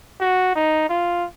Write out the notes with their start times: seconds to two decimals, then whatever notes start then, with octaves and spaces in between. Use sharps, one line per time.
0.21 F#4
0.55 D#4
0.89 F4